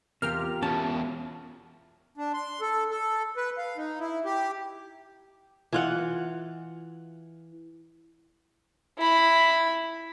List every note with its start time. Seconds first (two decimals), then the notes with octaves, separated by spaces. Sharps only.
0.22 E2 C3 F4 G4 A#4 F6
0.62 E2 B2 C#4 A5
2.17 D4
2.34 C6
2.61 A4
2.91 A4
3.37 B4
3.58 F5
3.77 D#4
4.00 E4
4.25 G4
5.72 E3 F4 F#5
8.99 E4 B5